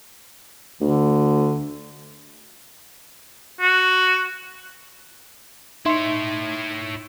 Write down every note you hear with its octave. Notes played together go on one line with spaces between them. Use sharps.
D2 D3
F#4
D#4 E4 C#5 E5 C6